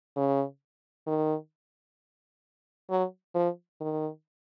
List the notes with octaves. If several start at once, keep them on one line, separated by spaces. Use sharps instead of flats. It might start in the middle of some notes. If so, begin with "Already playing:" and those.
C#3
D#3
F#3
F3
D#3